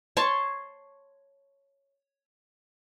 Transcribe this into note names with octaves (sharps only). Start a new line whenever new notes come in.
C#5 A5 C6 C#6